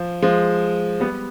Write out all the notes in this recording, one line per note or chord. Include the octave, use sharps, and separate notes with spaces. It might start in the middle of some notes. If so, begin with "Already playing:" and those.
Already playing: F3
F3 G#3
G3 B3